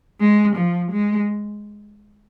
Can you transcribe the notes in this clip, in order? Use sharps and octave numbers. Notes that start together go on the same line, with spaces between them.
G#3
F3
G#3